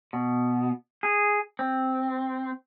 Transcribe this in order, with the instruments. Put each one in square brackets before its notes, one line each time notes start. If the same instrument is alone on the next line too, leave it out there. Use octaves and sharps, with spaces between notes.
[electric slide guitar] B2
G#4
C4